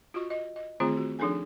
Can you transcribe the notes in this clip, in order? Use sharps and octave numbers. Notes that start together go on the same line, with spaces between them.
F4 F#4 D#5 C#6
D#5
D#5
D#3 E3 A3 C4 F4 G#4
F#4
F3 D4 D#4 G#4 A4 G#5